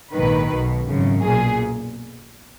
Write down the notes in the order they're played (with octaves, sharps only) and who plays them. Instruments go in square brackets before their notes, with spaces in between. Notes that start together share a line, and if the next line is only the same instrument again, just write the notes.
[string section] A#1 G#2 D#3 B4
B1 B2
G#1 F#2 C#3
B1 A#2 G#4